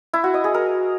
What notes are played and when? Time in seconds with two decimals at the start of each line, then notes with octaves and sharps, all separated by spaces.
0.13 E4
0.24 F#4
0.34 D#5
0.44 G#4
0.54 A#4